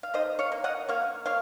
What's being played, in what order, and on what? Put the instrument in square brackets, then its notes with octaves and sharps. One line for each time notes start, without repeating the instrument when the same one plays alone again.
[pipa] F5
D#3 C5 D#5
C#5 F5
A#3
D#5 F#5
A#3 C#5 F5
A#3 C#5 F5